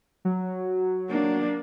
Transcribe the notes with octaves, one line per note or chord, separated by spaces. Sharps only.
F#3
A#3 D4